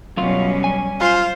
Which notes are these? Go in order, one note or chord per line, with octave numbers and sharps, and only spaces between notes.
F#2 B2 F#3 G3 C#4 F4
G#5
F4 C5